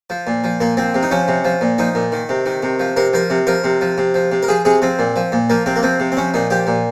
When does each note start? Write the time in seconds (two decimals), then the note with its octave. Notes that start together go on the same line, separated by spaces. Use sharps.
0.10 F3
0.27 A#2
0.44 F3
0.60 A#2 A#3
0.77 F3 C4
0.95 C3
1.03 D#4
1.11 F3 C#4
1.28 C3
1.45 F3
1.61 A#2
1.78 F3 D#4
1.95 A#2
2.12 D#3
2.29 C3
2.46 D#3
2.63 C3
2.80 F3
2.96 C3 A#4
3.13 F3 A#4
3.30 C3
3.47 F3 A#4
3.64 C3
3.81 F3
3.98 C3
4.14 F3
4.32 C3
4.43 A#4
4.48 F3 G#4
4.65 C3 G#4
4.82 F3 C4
4.99 A#2
5.16 F3
5.32 A#2
5.50 F3 A#3
5.66 C3 C4
5.76 A#3
5.83 F3 C4
6.00 C3
6.12 C4
6.17 F3 C#4
6.34 A#2 D#4
6.50 F3 G4
6.67 A#2